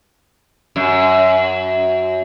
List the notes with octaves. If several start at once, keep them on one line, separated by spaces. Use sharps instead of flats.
F#2